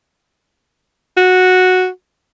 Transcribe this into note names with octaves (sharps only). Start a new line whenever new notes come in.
F#4